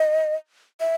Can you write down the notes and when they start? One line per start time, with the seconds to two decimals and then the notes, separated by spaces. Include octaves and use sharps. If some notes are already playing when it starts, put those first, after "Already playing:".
Already playing: D#5
0.80 E5